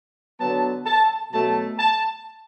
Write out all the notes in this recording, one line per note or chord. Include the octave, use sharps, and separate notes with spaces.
D3 F#3 B3 A5
A5
B2 F#3 A3 A5
A5